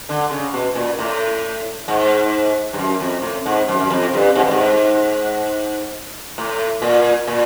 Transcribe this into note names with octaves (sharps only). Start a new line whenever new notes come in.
D3
C#3
B2
A#2
A2
G#2
G2
F#2
F2
A2
G#2
F#2
F#2
F2
G2
G#2
G2
G#2
A2
A#2
A#2